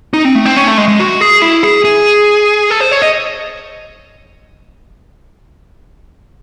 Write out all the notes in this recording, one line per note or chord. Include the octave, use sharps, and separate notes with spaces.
D#4
C4
A3
C4
C#4
A3
G#3
G#3
F#4
G#4
E4
G#4
G#4
A4
C5
C#5
D#5